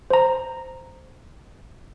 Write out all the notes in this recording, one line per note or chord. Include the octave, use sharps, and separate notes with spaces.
C5 A#5